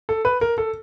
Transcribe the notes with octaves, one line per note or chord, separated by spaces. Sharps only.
A4
B4
A#4
A4